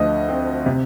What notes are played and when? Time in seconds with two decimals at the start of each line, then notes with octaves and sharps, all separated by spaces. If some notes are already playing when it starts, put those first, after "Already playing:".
Already playing: D2 D3 F3 D#5
0.29 C4
0.66 C3